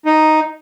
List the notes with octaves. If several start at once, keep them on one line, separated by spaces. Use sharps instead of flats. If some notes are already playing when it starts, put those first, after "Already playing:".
D#4